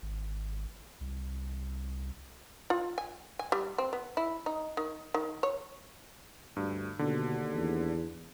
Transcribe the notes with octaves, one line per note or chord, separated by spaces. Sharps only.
G#1
C2
F4
G#5
G#5
G3
C4
B3
E4
D#4
D#3
D#3
C#5
D2 G2
D#2 B2 D3
E2